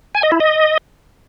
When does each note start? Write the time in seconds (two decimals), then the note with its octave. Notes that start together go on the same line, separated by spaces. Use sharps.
0.15 G#5
0.23 D#5
0.32 E4
0.40 D#5